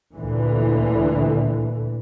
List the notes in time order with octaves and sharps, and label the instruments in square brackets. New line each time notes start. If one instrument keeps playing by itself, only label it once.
[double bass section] D2 A#2 D3 E3